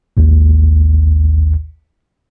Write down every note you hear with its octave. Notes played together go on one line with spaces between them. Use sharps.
A1 D#2